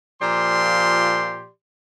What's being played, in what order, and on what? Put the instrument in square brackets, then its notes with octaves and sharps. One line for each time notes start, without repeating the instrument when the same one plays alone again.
[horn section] A#2 F3 G4 D5 C6